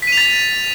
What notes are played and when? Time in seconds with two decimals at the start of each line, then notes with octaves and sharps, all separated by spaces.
0.02 B6
0.07 D#7
0.12 F7
0.17 A6